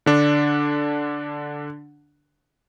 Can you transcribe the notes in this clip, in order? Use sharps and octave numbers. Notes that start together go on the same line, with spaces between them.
D3 D4